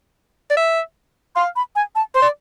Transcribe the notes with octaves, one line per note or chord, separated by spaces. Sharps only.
D5
E5
F5 C6
B5
G#5
A5
C5 C6
D5